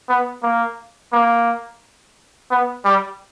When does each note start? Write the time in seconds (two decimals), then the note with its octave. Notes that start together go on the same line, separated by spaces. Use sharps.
0.09 B3
0.43 A#3
1.12 A#3
2.51 B3
2.85 G3